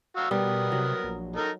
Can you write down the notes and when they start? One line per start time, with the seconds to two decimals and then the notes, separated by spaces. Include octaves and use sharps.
0.17 F#4 F5 E6
0.31 B2 G3 B3 A#4 D#6
0.72 C3 F#3
1.04 A#1
1.36 D#4 A4 A#4